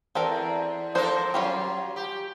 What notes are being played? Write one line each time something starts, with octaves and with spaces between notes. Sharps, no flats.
E2 C4 A4 A#4
F3 D4 A4 A#4 C5
F#3 G3 C#4 F4
G4